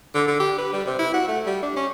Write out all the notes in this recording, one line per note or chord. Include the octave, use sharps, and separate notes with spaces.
D3
D3
G4
B4
G3
C3
E4
F#4
A3
G3
D4
C#4